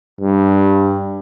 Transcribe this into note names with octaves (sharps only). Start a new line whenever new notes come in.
G2